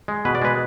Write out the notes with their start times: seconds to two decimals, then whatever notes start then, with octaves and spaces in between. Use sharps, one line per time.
0.08 G#3
0.25 B2 B4
0.35 D5
0.42 G#3 B4